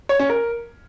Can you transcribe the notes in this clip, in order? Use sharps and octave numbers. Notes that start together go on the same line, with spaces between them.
C#5
C#4
A#4